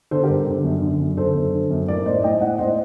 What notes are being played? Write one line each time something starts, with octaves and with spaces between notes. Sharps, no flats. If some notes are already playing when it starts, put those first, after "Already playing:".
D3 A4 C5
G4 A#4
G2
D3
F#2
D3
F#2
D3 A4 C5
F#2
D3
F#2
A2 A#4 D5
A2 C5 D#5
A2 D#5 G5
A2 D5 F#5
A2 C5 D#5